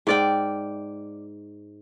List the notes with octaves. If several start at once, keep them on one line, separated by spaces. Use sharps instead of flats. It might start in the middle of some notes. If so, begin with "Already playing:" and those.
G#2 D5 G5